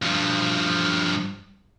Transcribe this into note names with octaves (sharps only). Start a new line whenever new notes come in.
G2 F3